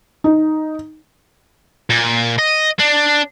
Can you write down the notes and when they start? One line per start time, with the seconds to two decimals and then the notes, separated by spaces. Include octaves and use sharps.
0.24 D#4
1.90 A#2
2.39 D#5
2.79 D4